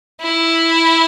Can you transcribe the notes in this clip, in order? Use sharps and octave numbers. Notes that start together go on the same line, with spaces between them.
E4